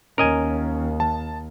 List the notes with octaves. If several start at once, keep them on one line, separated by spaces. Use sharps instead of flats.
D#2 C#4 A#4 D#5 G#5
A5